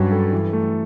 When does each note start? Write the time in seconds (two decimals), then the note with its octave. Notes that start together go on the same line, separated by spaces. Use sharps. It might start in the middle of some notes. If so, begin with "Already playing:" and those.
Already playing: G2 F#3 C#4 F#4
0.12 A4
0.33 E3
0.53 A3